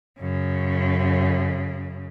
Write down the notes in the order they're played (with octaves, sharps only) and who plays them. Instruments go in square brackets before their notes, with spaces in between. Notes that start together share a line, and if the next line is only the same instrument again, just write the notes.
[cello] F#2 C#3